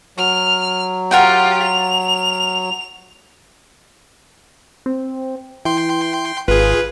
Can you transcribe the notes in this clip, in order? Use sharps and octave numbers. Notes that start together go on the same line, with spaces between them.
F#3 F6
F4 G4 A#4 F#5 G5
F7
C4
E3 G5 C6
G#1 F4 G#4 B4